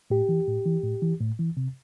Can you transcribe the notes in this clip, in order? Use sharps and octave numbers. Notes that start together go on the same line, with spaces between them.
A2 G4
E3
A2
E3
A2
E3
A2
E3
C3